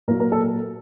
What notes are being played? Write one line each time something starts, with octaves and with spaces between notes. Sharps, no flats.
A#2 F#3 A#4
A#4
A4